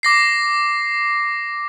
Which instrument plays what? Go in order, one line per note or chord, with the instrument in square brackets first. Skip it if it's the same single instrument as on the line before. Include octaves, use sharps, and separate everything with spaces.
[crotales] D6 A#6 C7